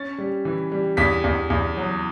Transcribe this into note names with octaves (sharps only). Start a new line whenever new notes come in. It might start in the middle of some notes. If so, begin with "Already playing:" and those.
Already playing: C#4 A6
G3
E3
G3
E2 B6
E2
E2
F#3